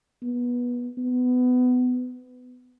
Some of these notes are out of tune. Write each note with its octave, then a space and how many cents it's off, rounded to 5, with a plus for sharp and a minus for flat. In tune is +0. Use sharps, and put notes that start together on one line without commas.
B3 -20
B3 +20